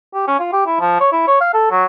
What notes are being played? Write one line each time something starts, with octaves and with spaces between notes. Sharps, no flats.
G4
C#4
F4
G4
E4
F3
C#5
E4
C#5
F5
A4
F#3